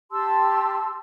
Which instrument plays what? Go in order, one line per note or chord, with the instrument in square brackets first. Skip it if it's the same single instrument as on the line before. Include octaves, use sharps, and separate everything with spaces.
[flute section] G4 A5 C6 E6